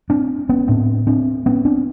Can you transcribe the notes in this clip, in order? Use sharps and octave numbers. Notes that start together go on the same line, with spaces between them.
C4 D4
B3 C#4
A2 C4 D4
C4 D4
B3 C#4
C4 D4